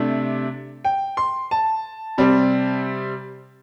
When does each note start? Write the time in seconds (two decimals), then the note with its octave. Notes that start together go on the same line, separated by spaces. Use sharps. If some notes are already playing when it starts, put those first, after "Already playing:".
Already playing: C3 A3 D4
0.85 G5
1.17 C6
1.51 A5
2.18 C3 G3 C4